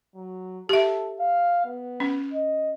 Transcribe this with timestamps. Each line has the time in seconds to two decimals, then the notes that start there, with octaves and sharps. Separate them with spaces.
0.15 F#3
0.69 G4 A4 E5
1.20 F5
1.66 B3
2.00 C#4
2.33 D#5